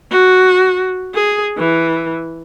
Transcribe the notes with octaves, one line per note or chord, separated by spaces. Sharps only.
F#4
G#4
E3